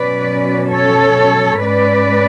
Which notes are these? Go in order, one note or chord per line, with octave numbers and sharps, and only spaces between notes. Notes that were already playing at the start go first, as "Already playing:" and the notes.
Already playing: B2 F#3 C#4 B4 D5
A4 C#5
G#2 G#3 C#4 B4 D5